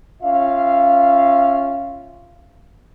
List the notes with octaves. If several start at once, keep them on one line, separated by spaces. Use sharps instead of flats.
C#4 F4 E5 F5